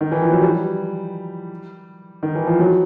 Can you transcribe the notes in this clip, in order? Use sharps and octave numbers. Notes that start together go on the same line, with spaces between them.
D#3
E3
F3
F#3
G3
D#3
E3
F3
F#3